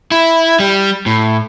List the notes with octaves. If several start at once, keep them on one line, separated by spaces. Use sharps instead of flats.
E4
G3
A2